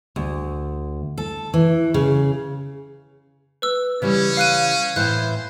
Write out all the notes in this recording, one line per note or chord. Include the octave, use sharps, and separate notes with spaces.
D2
A4
E3
C#3
B4 E6
C#3 E3 G3 C#4
F5 F#6 D#7
A2 E3 C5 F#6